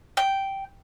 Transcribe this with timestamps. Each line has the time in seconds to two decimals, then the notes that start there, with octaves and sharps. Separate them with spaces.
0.17 G5